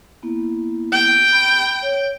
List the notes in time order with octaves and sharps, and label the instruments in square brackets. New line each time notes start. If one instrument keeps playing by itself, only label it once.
[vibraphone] A#3 B3 E4
[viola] G5
[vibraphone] B5
C#5